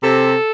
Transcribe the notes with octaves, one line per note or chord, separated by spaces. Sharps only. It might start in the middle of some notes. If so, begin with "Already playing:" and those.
C3 A4